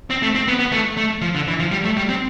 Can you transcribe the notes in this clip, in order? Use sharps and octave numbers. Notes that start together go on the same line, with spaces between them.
C4
A3
C4
B3
B3
A3
A3
F3
D3
E3
F3
G3
A3
G3
C4